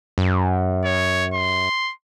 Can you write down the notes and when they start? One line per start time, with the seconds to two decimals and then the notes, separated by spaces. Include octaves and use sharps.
0.18 F#2
0.84 C#5
1.33 C6